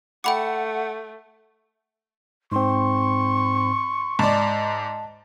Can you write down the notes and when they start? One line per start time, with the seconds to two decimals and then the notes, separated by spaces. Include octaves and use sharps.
0.24 A3 F#5 G5 B5 D6
2.52 G#2 C4 C6 C#6
4.19 G#2 D5 A5